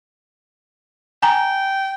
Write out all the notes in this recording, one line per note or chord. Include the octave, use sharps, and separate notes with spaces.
G5 G#5 A#5